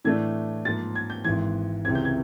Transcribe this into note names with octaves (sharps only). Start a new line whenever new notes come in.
A2 E3 A3 D4 G#6
G#2 F3 A#3 A6
G#6
G6
G#1 G#2 E3 G#6
C#2 C3 E3 G#3 C4 G#6
G6
G#6